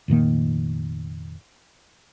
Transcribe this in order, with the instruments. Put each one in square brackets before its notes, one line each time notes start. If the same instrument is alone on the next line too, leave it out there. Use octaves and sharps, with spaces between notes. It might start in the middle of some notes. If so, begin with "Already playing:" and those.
[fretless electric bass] F1 A#2 D#3 A#3